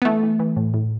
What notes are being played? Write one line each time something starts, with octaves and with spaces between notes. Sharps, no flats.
B3
E3 A3
E3
E3
A2
A2